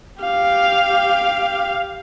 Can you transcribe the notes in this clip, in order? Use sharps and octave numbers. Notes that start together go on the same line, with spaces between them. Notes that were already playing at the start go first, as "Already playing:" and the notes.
G4 F5